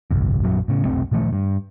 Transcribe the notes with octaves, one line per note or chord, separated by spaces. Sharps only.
G1 C2 F2
A#1 F#2 F#3
A2 C#3
F1 B1 A3 C4
A#2 D#3 F3 A3
G2